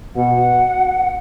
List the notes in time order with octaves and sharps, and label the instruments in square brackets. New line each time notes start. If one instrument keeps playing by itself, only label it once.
[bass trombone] B2 [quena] F#5